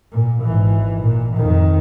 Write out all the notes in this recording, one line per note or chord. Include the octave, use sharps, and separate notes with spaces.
A#2
G#1 E3
A#2
F2 D#3